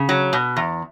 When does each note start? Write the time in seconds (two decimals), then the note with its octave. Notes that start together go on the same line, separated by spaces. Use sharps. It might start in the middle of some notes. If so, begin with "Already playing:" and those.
Already playing: C#3
0.09 F#3
0.33 B2
0.56 E2